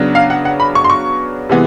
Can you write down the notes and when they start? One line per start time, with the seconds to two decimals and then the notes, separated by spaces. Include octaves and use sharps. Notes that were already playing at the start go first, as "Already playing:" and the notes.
Already playing: C#3 F#3 B3 D4
0.15 F5
0.30 F#5
0.45 F#5
0.60 B5
0.75 C#6
0.84 C6
0.90 C#6
1.49 C3 E3 G#3 B3